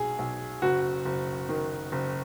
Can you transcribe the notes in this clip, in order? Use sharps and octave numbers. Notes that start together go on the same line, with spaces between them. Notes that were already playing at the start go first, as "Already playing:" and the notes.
Already playing: B1 G#4
B1
F#1 F#4
F#1
D#3
F#1